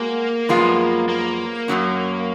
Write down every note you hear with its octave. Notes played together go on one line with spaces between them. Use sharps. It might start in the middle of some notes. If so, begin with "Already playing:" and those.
Already playing: G#3 A#3 F#4
F#2 F3 G#3 B3 F4
A#3
F#2 D#3 F#3 C#4